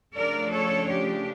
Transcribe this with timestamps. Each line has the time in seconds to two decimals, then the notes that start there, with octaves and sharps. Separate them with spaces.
0.15 C#3 F3 A3 D4 A#4 D5
0.51 A4 C#5
0.88 G4